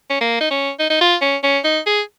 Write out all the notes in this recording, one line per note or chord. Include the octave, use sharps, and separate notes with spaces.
C#4
A#3
D#4
C#4
D#4
D#4
F4
C#4
C#4
D#4
G#4